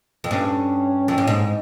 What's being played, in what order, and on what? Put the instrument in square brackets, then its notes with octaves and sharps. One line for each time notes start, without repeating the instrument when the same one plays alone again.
[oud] F2
[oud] G2 [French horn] C#4
[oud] F2
G2
[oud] G#2 [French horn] D#4